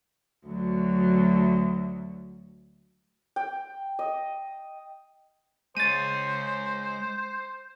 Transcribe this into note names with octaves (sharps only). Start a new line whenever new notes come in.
D2 F#3
G5
D#5
G#3 C5 C#5 A6 D#7